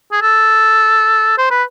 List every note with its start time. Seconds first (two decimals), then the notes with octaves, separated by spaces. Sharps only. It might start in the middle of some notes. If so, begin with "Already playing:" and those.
0.12 G#4
0.22 A4
1.38 C5
1.51 B4